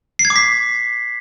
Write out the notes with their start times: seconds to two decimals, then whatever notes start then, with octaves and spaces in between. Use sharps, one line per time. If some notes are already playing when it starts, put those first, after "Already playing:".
0.19 C7
0.25 G#6
0.30 D6
0.36 B6